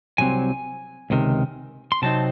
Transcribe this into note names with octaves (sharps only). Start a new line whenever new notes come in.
C2 C3 F#3 C4 G#5
C#2 C3 D#3
C6
C3 F#3 C4 D#4 A5